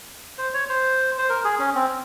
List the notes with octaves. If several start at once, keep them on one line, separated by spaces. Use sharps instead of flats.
C5
C#5
C5
C5
A#4
G#4
C#4
C4